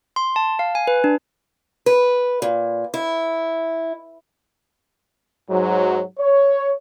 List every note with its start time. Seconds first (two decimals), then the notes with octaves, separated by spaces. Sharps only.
0.16 C6
0.36 A5
0.59 F5
0.75 G#5
0.87 B4
1.04 D4
1.86 B4
2.42 A#2
2.94 E4
5.49 G#2 F#3
6.19 C#5